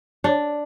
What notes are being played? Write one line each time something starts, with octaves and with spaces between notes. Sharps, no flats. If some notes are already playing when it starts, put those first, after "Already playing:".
D4